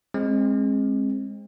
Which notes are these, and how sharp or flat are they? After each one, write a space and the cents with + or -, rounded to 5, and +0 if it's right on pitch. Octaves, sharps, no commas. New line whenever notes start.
G#3 +0 C4 +30